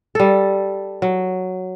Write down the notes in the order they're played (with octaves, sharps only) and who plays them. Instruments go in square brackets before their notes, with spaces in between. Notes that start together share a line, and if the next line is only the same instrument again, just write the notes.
[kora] G3 A4
F#3